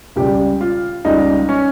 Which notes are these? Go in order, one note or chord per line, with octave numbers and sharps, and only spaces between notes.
C#2 C#3 G3 G4
F4
C#2 C#3 G3 D#4
C#4